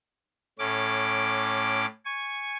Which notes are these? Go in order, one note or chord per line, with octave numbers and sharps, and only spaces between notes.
A2 C#4 D6
G#5 C#6